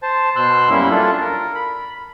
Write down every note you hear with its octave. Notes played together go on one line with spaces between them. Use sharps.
C5 A5
B2 C6 E6 F#6
F#2 G3 A#3 C#4 E4
D4 F4 A4
A#4
B5